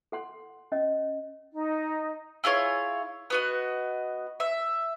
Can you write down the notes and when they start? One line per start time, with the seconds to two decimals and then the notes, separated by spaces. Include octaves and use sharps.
0.12 A4 F#5 C6
0.72 C#4 D#5
1.52 D#4
2.44 E4 F4 G#4 C#5
3.30 B3 F#4 D#5
4.40 E5